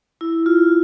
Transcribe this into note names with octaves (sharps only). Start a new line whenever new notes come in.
E4
F4